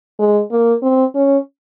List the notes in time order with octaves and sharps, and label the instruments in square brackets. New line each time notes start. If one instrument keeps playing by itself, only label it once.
[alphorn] G#3
A#3
C4
C#4